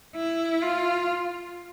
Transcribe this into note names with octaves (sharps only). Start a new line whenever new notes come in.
E4
F4